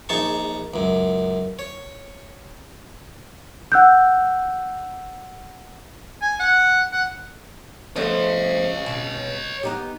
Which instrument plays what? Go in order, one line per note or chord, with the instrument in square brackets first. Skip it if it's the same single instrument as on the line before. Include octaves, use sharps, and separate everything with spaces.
[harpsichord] A#1 D#4 G#4 A5 C#6
C#2 F#2
C#5
[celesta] F#5 E6 F#6 G6
[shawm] G#5
F#5
F#5
[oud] F3 A3 B3 [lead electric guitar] C#5 D#5
[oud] B2
B3 D#4 G4